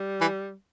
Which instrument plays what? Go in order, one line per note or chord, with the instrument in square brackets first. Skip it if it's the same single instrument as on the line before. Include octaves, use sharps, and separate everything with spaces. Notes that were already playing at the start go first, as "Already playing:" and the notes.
Already playing: [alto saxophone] G3
[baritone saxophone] E3